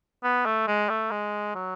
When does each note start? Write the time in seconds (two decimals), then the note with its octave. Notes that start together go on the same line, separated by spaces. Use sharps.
0.24 B3
0.46 A3
0.68 G#3
0.89 A3
1.11 G#3
1.55 F#3